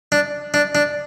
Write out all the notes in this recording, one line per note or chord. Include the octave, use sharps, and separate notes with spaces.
D4
D4
D4